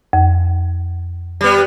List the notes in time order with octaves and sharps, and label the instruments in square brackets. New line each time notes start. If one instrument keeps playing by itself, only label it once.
[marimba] F2
[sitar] G3 B3